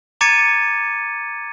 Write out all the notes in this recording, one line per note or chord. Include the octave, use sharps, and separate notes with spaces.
A#5 D6 G#6 A6 C#7 D#7